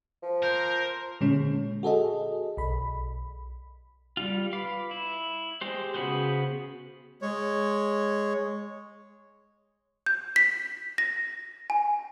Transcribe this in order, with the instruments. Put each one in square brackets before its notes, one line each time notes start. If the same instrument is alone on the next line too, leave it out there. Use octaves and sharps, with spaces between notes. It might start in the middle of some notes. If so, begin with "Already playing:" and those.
[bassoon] F3
[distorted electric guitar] A#4 [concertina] C5
[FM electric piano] A#2 D3 G#3 C#4
F#4 G#4 A4 D#5
B1 B5
[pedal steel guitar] G3 F4
B4 F5 D6
E4
G#3 G4 C5
C#3 B3 F#4 G#4 C5
[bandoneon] G#3 C#5
[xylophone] G6
B6
A#6
G#5